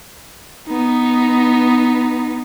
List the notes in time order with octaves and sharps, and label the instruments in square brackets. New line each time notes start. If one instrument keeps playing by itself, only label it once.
[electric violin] B3 D#4